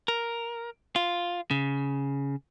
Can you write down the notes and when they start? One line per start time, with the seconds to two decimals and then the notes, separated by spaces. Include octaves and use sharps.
0.08 A#4
0.96 F4
1.51 C#3